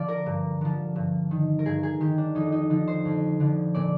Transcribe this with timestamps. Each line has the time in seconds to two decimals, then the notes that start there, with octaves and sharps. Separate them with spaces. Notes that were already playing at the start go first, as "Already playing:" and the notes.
Already playing: D3 F3 D5 F5
0.08 A#4
0.26 G2
0.61 D3 F3
0.96 G2
1.31 D#3
1.59 A#4
1.65 G2 G#4
1.83 G#4
2.00 D#3 G4
2.18 D4
2.35 F2 D#4
2.52 D#4
2.70 D3 F3 D#4
2.87 C5
3.05 F2
3.40 D3 F3
3.74 A#2 D5